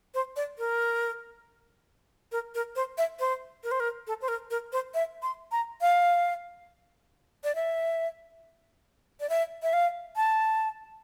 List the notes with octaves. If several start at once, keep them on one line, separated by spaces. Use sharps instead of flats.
C5
D5
A#4
A#4
A#4
C5
E5
C5
A#4
C5
A#4
A4
C5
A#4
A#4
C5
E5
C6
A#5
F5
D5
E5
D5
E5
E5
F5
A5